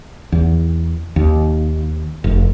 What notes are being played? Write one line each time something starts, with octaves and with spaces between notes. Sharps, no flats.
E2
D#2
F1